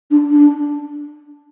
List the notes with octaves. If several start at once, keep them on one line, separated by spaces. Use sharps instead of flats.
D4
D4